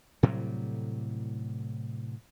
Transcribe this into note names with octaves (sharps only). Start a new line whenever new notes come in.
A2 C3 F#3 G3